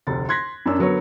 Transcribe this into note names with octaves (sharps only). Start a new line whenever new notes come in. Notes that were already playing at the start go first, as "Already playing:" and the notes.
F1 D2 D3 A6
C6 F#6 G#6 A#6 B6
F#2 C#4 D4 E6
D3 F#3 B3 A#4 C#5